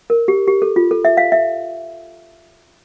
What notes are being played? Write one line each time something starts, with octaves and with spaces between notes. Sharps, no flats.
A#4
G4
G4
A4
F4
A4
E5
F5
E5